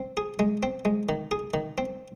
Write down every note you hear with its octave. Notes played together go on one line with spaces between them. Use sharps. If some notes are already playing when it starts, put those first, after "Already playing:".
Already playing: C4
G#4
G#3
C4
G#3
D#3
G#4
D#3
C4